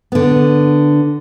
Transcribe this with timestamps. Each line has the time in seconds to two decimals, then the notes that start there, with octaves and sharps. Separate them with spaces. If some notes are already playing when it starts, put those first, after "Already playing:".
0.12 D3 B3